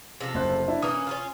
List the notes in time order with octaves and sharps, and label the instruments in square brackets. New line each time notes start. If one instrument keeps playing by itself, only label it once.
[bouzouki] C3 F3 A4
[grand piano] F#1 C5 F#6
D4 E4 E5
[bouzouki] E3 A#3 C#4 [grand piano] D#6
[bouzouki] C#4 D#4 F4